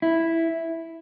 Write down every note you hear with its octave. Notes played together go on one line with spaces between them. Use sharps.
E4